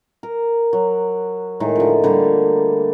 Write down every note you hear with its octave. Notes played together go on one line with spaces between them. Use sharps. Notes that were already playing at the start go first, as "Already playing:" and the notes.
A#4
F#3
A2 D#3 G#3
D3 F3
D3 G3 A3 A#3